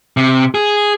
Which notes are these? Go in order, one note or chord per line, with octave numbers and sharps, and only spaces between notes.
C3
G#4